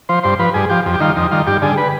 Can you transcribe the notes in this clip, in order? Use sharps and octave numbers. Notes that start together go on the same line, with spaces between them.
F3 C5
G2 C5
F3 B4
G2 G#4
F3 G4
F2
G4
D#3 G3 F4
F2 D#4
D#3 G3 F4
G2 G4
D3 G3 G#4
B4